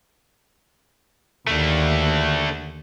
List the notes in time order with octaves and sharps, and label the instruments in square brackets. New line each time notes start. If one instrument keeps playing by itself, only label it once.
[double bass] D#2 [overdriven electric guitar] D3 A3